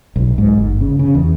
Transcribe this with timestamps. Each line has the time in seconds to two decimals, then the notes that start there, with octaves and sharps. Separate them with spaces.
0.16 B1
0.38 G#2
0.57 G1
0.81 C#3
0.99 C#3
1.15 E2